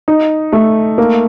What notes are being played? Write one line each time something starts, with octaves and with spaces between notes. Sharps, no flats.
D#4
A3
A#3